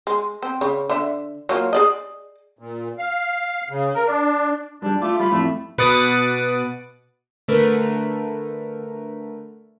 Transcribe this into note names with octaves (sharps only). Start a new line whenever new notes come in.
G#3
C4
C#3
D3 E5
F#3 A#3 F4
G#4 D5 D#5
A#2
F5
C#3
A#4
D4
G2 G3 D4
A3 F4 D6
G3 F4 B5
F2 A2 A3
B2 B4 F#5 D6 D#6 A6
D3 A3 A#4 B4